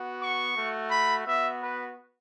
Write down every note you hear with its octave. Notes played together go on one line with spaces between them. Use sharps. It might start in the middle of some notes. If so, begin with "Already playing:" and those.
Already playing: B3 F#4
C#6
A3 F#4
B5
B3 F#4 E5
B4